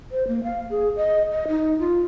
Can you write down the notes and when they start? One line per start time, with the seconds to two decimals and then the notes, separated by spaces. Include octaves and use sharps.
0.11 C5
0.28 A#3
0.44 F5
0.70 G#4
0.96 D#5
1.31 D#5
1.48 D#4
1.79 F4